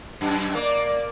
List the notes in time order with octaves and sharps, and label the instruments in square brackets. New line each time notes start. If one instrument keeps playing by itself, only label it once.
[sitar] F#2
[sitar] A#3 [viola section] D5